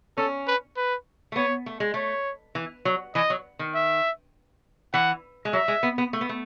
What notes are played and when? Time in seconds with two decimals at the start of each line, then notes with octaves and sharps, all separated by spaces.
0.17 C#4 A4
0.47 B4
0.77 B4
1.32 A3
1.36 B3 C#5
1.66 A3
1.80 G#3
1.94 A3 C#5
2.55 E3
2.85 F#3
3.15 E3 D#5
3.30 F#3
3.59 D#3
3.75 E5
4.94 E3 F#5
5.45 G#3
5.53 F#3 E5
5.68 G#3
5.83 B3
5.98 B3
6.13 A3
6.21 B3
6.29 A3